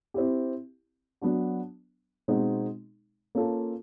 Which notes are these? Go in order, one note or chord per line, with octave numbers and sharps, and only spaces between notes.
C4 E4 G4
F#3 B3 D4 F#4
B2 G#3 C4 D#4 F#4
A#3 C#4 F4 A4